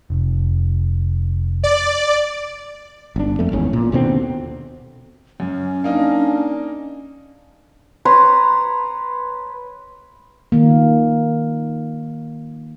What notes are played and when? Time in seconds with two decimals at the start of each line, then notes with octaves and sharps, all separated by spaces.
0.10 F1
1.64 D5
3.16 G1 D4
3.39 F2 A3
3.52 G#1 E2 C#4
3.73 A#2
3.92 D#2 B2 D3 C4
5.40 F#2 C#4
5.84 A#3 D4 D#4
8.05 B4 C#5 A#5 C6
10.52 D#3 A#3